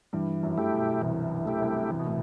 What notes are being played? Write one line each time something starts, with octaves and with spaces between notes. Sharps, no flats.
G2 E3 G3
F#2 F#3
A3 E4 G4
B2
C2 C3 E3
A3 E4 G4
C2 C3
C3 E3
B2
A2